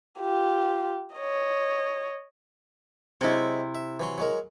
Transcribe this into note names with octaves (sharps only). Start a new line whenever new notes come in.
F4 G4
C#5 D#5
C3 F#3 G#3 C4 E4
E5
E3 F#3 C6
F#3 G#3 A#4